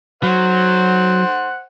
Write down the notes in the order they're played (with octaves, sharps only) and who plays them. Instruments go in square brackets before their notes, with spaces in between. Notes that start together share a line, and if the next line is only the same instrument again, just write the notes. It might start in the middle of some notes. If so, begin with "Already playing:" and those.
[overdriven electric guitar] F#3 [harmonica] C5 F#5